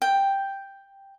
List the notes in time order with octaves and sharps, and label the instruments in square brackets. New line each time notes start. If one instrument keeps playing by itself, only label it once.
[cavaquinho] G5